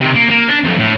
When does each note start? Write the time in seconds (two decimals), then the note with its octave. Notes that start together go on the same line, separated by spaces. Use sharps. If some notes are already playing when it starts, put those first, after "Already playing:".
0.01 C3 D#3
0.15 A#3
0.30 A#3
0.48 D4
0.64 B1 F2
0.79 A2